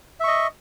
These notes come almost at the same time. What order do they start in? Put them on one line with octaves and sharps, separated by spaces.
E5 C#6 D#5